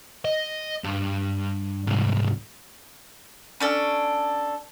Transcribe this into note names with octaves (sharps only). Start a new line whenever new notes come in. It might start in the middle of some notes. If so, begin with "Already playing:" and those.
D#5
G2
C2 G#2
C#4 D4 A4